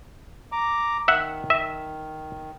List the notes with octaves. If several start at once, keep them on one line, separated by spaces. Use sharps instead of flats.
A#5 D6
D#3 E5 F#5
E5